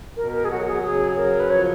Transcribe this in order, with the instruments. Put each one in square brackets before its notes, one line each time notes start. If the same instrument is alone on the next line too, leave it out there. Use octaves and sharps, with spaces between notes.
[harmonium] B2 [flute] A#4
[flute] A#4
G#4
[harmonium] F#3 [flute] F#4
[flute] G#4
[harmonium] C#3 [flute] G#4
[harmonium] F#3 [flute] A#4
[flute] B4
[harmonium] F3 [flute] C#5